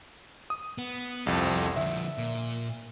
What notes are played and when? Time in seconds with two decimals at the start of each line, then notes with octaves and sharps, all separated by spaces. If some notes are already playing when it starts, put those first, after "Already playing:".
0.50 D#6
0.78 B3
1.27 C2 F2 C4 A4
1.76 D3 F3 E5
2.18 A#2